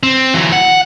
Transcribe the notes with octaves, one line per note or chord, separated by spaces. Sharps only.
C4
E3 F#3
F#5